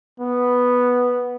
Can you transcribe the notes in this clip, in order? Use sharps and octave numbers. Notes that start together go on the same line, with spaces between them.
B3